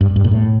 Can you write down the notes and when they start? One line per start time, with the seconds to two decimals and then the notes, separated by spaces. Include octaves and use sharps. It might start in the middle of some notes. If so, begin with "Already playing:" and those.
0.01 G2
0.16 G2
0.24 A#2
0.31 A2